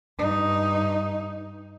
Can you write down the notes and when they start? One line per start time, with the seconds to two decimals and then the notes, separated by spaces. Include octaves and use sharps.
0.19 G2 D#4